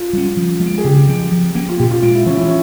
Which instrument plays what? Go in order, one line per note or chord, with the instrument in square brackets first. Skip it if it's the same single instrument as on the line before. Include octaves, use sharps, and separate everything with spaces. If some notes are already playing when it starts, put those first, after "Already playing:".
Already playing: [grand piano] F4
[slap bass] G3 C#4
F3
G#3
C4
[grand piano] G#4
[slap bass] C#3 [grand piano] G4
[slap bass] F3 C4
F3
A#3 C#4
[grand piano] F4
[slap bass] A#2 [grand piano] G4
[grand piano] F4
[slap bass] G#3 C4 [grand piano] F4
[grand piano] E4
[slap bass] E3 [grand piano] C#4
[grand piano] E4
C#4